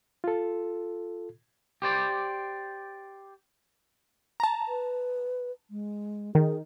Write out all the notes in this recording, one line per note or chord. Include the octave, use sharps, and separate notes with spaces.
F4 A4
G4 C5 D5
A5 A#5
B4
G#3
D#3 G#4